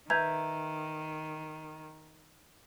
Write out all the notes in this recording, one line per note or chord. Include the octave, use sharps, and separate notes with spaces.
D#3 B4 E5 A#5 G6 G#6